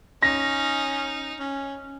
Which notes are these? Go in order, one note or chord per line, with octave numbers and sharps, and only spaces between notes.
C#4 D#4 A#6
C#4